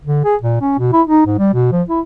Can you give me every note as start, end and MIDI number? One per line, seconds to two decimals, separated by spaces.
0.05 0.24 50
0.24 0.36 68
0.41 0.58 46
0.61 0.75 61
0.79 0.92 47
0.93 1.02 64
1.07 1.25 63
1.26 1.36 44
1.38 1.51 55
1.54 1.69 47
1.72 1.82 53
1.89 2.01 64